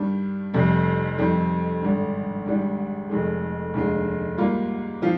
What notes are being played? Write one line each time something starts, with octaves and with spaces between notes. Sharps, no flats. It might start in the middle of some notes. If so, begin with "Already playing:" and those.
Already playing: G2 D#3 G3 D4
F1 F2 C3 G3 C4
F2 D#3 G3 C4 D#4
G#1 G2 D3
G#1 G#2 G3 D4
F1 F2 D#3 G#3
F1 D#2 D3 G#3
G#2 G3 A#3 F4
F3 C4 F4